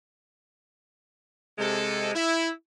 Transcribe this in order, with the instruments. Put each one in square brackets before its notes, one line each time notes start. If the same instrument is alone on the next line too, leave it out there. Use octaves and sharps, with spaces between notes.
[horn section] C3 G#3 A4
E4